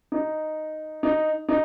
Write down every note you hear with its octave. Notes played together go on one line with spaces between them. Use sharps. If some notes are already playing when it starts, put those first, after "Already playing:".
D#4
D#4
D#4